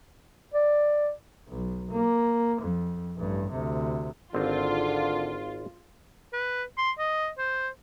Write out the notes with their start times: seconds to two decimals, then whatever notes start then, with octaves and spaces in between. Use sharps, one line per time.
0.54 D5
1.48 B1
1.91 A#3
2.62 F2
3.17 A1 G2
3.51 D2 C3
4.34 G#1 D3 C4 F4
6.33 B4
6.78 C6
6.99 D#5
7.38 C5